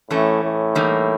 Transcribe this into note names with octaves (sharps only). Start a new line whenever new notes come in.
A2 E3 A3 C#4
A2
E3 G3 A#3 D#4